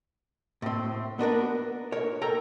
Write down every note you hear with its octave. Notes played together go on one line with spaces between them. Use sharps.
A2 C4
B3 D4 A#4 B4
A#4 C#5
A4 A#4 G5 A#5